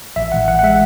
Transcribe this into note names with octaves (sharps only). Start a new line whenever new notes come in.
A1 E5
A1 F#5
E3 F#5
F#5
G#3 E5